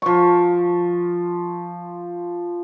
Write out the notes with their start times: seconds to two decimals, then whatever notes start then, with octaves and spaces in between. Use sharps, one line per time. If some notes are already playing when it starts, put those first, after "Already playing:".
0.02 F3 C#6